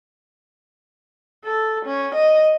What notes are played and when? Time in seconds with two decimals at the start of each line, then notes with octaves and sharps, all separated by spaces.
1.45 A4
1.85 C#4
2.14 D#5